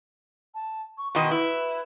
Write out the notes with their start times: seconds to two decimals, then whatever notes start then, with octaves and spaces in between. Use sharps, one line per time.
0.55 A5
0.98 C#6
1.15 B2 D#3 D#5 C6
1.31 E4 B4